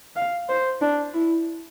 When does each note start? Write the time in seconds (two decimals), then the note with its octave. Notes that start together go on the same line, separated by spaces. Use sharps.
0.16 F5
0.49 C5
0.81 D4
1.14 E4